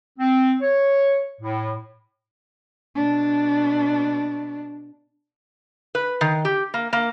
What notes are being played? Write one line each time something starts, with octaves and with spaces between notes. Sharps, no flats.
C4
C#5
A2
B2 D4
B4
D#3
G4
A#3
A#3